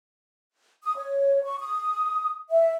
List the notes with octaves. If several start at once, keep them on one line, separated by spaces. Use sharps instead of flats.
D#6
C#5
C#6
D#6
E5